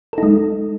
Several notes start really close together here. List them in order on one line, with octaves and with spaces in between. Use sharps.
A4 D#4 G#3